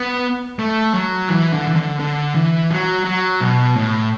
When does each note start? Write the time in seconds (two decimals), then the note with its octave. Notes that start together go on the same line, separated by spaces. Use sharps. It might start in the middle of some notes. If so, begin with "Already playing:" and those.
Already playing: B3
0.59 A3
0.94 F#3
1.29 E3
1.53 D3
1.67 E3
1.76 D3
2.00 D3
2.35 E3
2.70 F#3
3.05 F#3
3.41 B2
3.76 A2